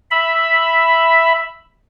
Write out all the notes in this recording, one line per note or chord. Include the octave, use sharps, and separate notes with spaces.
E5 B5